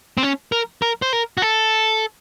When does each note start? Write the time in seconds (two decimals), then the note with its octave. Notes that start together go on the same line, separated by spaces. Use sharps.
0.18 C4
0.23 C#4
0.52 A#4
0.82 A#4
1.02 C5
1.13 A#4
1.38 F#4
1.42 A4